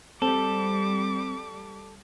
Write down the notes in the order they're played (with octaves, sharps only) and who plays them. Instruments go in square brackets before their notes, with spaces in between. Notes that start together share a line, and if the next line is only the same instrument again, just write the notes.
[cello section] G3 [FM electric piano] C4 [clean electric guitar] A4 [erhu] D6